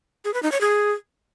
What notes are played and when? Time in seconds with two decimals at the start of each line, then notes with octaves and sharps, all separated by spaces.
0.25 G#4
0.34 B4
0.43 D#4
0.52 C#5
0.61 G#4